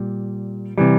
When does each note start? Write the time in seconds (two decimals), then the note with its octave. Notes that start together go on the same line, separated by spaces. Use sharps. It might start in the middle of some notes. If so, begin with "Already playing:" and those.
Already playing: A#2 G3
0.78 C3 E3 G3